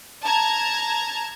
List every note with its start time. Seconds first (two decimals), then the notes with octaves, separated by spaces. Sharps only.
0.23 A5 A#5 G#6